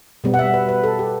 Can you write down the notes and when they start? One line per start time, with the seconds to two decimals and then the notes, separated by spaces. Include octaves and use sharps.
0.24 B2 G3 B3
0.34 F#5
0.39 E5
0.54 B4
0.69 B4
0.84 A4
0.99 G4